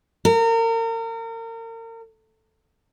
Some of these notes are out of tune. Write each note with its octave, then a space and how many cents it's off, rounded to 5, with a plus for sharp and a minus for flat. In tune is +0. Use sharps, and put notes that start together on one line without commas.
A#4 -35